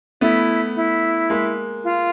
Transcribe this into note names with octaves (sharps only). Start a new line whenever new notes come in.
A3 B3 E4
E4
G#3 A#3
F4